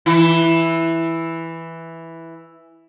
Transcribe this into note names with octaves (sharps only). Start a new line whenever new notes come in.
E3 E4